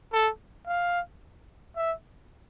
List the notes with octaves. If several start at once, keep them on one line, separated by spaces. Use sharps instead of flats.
A4
F5
E5